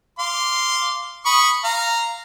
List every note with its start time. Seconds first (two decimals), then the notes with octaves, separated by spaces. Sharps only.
0.19 F5 C6 D6
1.26 B5 C#6 D#6
1.64 F5 A#5